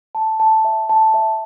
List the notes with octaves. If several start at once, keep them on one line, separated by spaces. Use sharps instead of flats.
A5
A5
E5
A5
E5